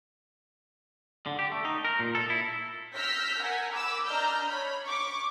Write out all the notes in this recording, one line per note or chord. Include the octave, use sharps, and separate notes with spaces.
D3
G4
A3
D#4
A#4
A#2
A4
E4
E6 F6 G6 A#6 B6
A#4 F#5 G#5
B5 D6 E6
D4 D#5 A#5 F6 G6
C#5 B5
C#6 D6